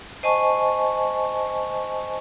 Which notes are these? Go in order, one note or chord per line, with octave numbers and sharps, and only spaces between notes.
C5 D#5 G#5 A5 C#6